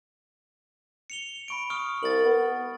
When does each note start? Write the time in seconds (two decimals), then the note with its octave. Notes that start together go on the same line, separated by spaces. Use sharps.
1.10 C#7 F7 G7
1.48 B5 C#6 D7
1.70 C#6 D#6 F6
2.03 C2 A6 F#7
2.25 B3